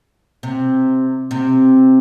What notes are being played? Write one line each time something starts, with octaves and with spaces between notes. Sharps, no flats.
C3
C3